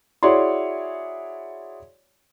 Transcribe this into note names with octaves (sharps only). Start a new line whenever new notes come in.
E4 F#4 G#4 C#5 D5 C6